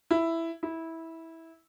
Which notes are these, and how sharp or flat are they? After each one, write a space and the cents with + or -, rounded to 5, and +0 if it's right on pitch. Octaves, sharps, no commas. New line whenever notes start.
E4 +5
E4 -15